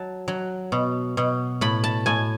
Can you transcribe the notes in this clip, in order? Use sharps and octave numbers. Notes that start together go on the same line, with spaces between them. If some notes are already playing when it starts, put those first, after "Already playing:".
Already playing: F#3 A5
F#3
B2
B2
A2 B5
A5
A2 G#5